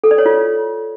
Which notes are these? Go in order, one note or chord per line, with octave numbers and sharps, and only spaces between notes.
A4
D5
C#5
F4